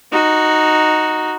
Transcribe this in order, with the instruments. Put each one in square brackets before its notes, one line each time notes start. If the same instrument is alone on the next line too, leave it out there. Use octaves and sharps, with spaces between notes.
[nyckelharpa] D#4 F#4